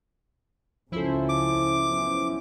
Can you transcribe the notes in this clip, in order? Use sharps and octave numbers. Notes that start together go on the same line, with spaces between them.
C#2 C#3 F3 C#4 E4 A4 C5
D6
F#3 B3 C#4